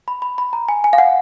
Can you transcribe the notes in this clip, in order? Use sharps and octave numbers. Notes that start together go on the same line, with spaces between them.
B5
B5
B5
A#5
G#5
G#5
F5
F#5